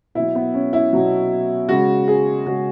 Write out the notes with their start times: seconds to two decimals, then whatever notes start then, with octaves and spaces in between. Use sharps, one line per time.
0.15 B2 F#3 E4
0.35 B3
0.54 C#4
0.73 E4
0.93 B2 F#3
1.69 C#3 G#3 F#4
2.08 G#4
2.46 C#3 G#3 F#4